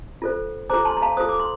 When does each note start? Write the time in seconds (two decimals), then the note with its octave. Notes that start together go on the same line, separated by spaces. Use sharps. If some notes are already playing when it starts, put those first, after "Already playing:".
0.22 F4 A4 C5
0.70 F4 A4 C5 A#5 D6
0.85 A5 C6
0.97 A#5
1.02 F5 A5
1.17 F4 A4 C5 D#6
1.29 D6
1.40 C6